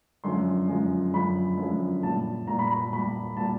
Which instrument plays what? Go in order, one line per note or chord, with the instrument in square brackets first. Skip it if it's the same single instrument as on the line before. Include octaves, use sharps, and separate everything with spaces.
[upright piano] F#2 D3 F3 G#3 C6
F#2 D3 F3 G#3
F#2 D3 F3 G#3 B5
F#2 D3 F3 G#3
A#2 G3 A5
A#2 G3 A#5
B5
B5
A#2 G3 B5
A#2 G3 A5